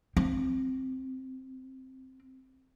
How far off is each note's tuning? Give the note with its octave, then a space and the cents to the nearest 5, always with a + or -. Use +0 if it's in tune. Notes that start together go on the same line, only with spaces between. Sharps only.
C4 +0